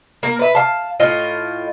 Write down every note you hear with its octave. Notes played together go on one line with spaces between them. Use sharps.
A#3 A#4
B4 E5
F5 A5
A2 F4 D#5 F5